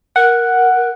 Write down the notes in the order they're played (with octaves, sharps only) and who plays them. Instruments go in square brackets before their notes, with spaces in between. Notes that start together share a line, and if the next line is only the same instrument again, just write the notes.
[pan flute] A#4 [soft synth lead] F#5